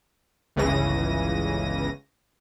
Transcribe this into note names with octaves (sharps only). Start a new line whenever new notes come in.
G1 C#2 C#3 E3 A#6 D#7